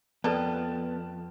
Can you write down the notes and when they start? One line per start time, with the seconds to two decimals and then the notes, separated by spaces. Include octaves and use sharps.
0.24 F2 B3 A4 B4 D5 A5